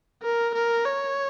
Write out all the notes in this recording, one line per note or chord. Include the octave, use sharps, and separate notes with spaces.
A#4
A#4
C#5